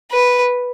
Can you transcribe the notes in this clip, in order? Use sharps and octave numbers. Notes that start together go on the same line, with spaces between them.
B4